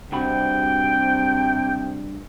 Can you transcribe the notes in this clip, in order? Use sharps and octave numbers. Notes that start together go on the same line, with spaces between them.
G2 C3 F#4 G5 B5